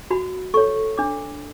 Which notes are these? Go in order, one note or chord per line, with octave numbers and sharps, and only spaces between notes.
F#4 B5
A4 C#5 C#6
D4 D6